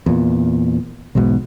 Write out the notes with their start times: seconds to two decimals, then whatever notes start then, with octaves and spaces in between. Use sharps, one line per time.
0.06 E2 A#2
1.15 B1 E2 G#2 B2